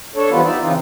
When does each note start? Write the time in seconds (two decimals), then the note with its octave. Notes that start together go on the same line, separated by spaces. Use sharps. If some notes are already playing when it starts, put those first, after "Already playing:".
0.15 D4 A4 C#5
0.30 E3 F3 G3 B3 F4 B4
0.44 D#4 D5 E5
0.61 C#3 E3 C4 D#4 F4